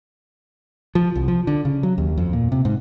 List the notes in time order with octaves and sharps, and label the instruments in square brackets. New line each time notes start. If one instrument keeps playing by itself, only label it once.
[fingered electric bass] F3
C2
F3
D3
C#3
F#3
D#2
F2
A#2
C3
G#2